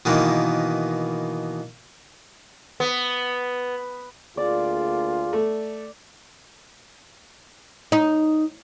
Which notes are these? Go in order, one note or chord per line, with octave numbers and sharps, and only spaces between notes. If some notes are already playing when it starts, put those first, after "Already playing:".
B2 D#3 E3 A#3
B3
D2 A#3 F4 G#4 D5
A3
D#4